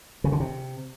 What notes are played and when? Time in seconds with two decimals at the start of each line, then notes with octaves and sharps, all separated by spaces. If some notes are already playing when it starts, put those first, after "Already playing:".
0.24 C#3
0.32 D3
0.40 C3